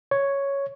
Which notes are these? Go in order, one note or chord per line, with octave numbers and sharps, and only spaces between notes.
C#5